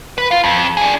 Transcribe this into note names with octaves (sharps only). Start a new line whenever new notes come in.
B4
F4 F5
F2
D4 G#4